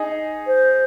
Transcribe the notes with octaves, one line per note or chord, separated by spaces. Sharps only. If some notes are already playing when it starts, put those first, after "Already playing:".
Already playing: D#4 G#4
C5